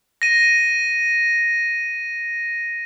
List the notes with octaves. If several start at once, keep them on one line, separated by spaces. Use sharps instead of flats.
A#6 D#7